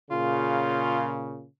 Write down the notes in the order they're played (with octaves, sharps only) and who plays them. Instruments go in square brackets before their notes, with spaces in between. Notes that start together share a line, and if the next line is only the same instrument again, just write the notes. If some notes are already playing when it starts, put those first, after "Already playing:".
[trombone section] A#2 C#3 [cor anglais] F4